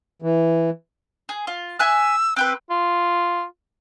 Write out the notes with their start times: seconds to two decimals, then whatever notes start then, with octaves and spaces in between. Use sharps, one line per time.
0.22 E3
1.29 G#4
1.47 F4
1.79 E5 G#5 E6 F#6
2.36 C4 G4 B4 F#6
2.70 F4